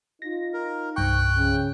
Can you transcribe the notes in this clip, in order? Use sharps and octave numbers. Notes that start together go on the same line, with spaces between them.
D#4 F4 A#6
A#4
C2 G2 G5 C#6 F#6
C#3